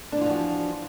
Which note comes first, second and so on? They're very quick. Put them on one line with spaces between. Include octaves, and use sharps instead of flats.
D4 E3 F4 F3 F#4